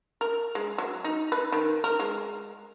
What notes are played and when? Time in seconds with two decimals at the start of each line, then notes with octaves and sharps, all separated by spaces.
0.21 A#4
0.55 G#3
0.78 F#3
1.04 D#4
1.32 B4
1.52 D#3
1.84 A#4
2.00 G#3